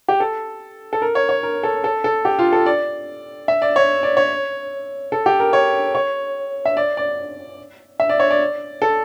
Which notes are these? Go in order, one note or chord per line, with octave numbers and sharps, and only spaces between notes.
G4
A4
A4
A#4
C#5
C#5
A#4
A4
A4
A4
G4
F4
A4
D5
E5
D5
C#5
D5
C#5
A4
G4
A#4
C#5
C#5
E5
D5
D5
E5
D5
C#5
D5
A4